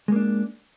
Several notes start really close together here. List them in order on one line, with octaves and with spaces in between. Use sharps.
G#3 A#3 D4